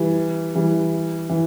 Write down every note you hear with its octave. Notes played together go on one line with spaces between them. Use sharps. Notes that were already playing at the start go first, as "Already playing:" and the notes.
Already playing: E3 G3
E3 G3
E3